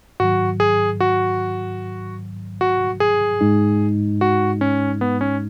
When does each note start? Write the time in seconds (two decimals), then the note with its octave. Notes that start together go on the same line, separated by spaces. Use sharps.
0.20 G#2 D#3 F#3 F#4
0.60 G#4
1.00 F#4
2.61 F#4
3.00 G#4
3.41 G#2 G#3 D#4
4.21 F#4
4.61 C#4
5.01 B3
5.21 C#4